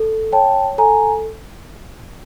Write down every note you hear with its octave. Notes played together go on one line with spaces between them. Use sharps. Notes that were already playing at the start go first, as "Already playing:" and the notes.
Already playing: A4
C#5 G5 A5
A4 G#5 A#5